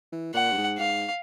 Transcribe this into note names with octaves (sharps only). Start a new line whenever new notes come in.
E3
A#2 F#5
G2
G#2
G#2 F5